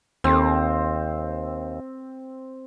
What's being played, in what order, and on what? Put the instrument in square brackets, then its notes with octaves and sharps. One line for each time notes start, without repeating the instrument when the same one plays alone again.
[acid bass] D#2 [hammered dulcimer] C4